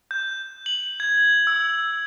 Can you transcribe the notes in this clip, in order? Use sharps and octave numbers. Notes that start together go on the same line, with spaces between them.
G6
F#7
G#6
E6